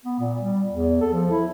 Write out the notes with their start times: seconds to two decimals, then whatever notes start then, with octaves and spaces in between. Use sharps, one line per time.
0.05 B3
0.20 A#2
0.40 G3
0.70 E2
1.01 A4
1.13 F3
1.31 E4